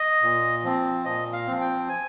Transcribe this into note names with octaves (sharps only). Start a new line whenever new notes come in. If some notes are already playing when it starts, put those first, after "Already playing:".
Already playing: D#5
A#2
F3 C4
A#2 D#5
F5
F3 C4
G5
G#5